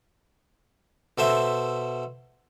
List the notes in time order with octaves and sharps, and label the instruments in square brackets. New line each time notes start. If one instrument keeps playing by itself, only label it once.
[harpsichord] B2 A4 C5 E5